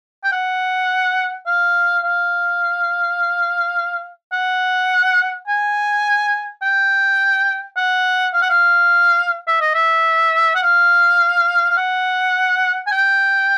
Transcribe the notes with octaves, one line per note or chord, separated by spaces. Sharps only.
G5
F#5
F5
F5
F#5
G#5
G5
F#5
F5
F#5
F5
E5
D#5
E5
F#5
F5
F5
F#5
G#5
G5